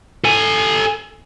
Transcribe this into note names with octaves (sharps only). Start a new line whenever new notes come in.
A4 G#5